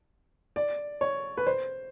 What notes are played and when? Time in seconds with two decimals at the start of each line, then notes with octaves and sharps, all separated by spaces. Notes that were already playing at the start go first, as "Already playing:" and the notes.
0.56 D5
1.01 C#5
1.37 B4
1.47 C5